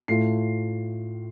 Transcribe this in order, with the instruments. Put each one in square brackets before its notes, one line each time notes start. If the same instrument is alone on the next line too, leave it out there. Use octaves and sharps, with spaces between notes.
[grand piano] A2 A3 F4 C7